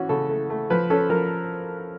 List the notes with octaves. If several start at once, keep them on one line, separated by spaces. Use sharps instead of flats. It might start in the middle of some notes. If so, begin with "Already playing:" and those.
Already playing: E3 C#4 F#4
C#3 A4
A3
A3
F3 B4
C#4 A4
F3 A#4